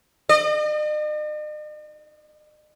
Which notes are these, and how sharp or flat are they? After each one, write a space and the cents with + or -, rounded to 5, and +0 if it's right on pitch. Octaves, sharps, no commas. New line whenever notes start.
D#5 -45